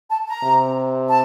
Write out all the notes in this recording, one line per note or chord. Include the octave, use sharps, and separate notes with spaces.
A5
A#5
C3
A5